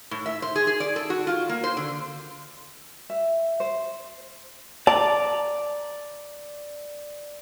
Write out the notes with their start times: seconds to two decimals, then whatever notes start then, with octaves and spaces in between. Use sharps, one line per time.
0.11 A2
0.26 E5
0.42 C5
0.56 G#4
0.67 G#4
0.80 D5
0.96 A4
1.10 F#4
1.27 F4
1.49 A#3
1.64 C5
1.77 D3
3.10 E5
3.60 C5
4.87 D5 A5 A#5 D6